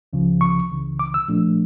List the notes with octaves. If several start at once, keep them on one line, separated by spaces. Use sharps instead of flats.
C#2 C#3 F3
C#6
C#2 C#3 E3
D6
E6
A#2 F3 A3 D4